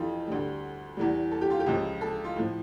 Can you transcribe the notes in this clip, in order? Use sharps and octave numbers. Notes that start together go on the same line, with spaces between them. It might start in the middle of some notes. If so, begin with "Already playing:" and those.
Already playing: F2 E3 F4 G4 A4
D2 D3 G3
E2 E3 G3
A4
G4
F4
G4
C#2 C#3 F3
A4
F4
A2 F3